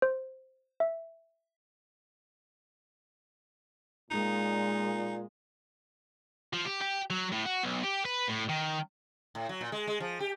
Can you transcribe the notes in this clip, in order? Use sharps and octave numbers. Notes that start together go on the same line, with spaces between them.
C5
E5
A#2 G#3 D#4
F3
G4
G4
F#3
A2
F#4
B1
G4
B4
A2
D#3
A2
F#3
A#2
G#3
G#3
F3
G4